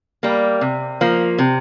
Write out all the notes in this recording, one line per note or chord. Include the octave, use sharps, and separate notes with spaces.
G3 A#3
C3
F3 A#3
C3